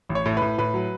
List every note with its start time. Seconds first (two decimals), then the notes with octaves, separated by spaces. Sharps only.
0.09 A1
0.15 C#5
0.26 A2
0.37 A2 B4
0.58 A2 B4
0.74 F#3